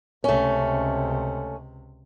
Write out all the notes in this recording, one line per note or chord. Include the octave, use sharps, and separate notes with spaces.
C#2 C3 A3 C#4